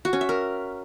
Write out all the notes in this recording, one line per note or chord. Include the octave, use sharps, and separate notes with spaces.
F#4
C#4
E5
A#4